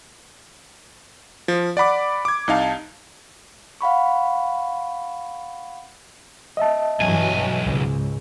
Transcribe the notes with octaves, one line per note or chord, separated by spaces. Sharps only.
F3
D5 F#5 B5 D6
D6 G#6
C2 D#4 F5 A5
F5 F#5 B5 C#6
D#5 E5 A5
B1 G2 E3 F#3 G#5
C#2 G#2